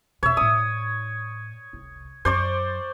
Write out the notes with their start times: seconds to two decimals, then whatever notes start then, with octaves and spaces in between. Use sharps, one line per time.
0.23 E2 B2 C#5 E5
0.37 A2 E4 D#6
1.73 F1 C2
2.25 F#2 C5 D5 C#6